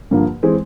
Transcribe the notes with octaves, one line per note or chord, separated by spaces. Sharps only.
G2 D3 F3 A#3
E3 G#3 C4